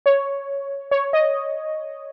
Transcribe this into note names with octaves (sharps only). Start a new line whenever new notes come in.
C#5
C#5
D#5